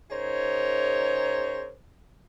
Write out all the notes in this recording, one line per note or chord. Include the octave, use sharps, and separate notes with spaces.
C#3 D#4 G#4 A#4 C5 C#5